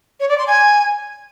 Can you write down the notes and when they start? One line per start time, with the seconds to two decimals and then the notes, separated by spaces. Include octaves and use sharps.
0.20 C#5
0.29 D5
0.38 C6
0.47 G#5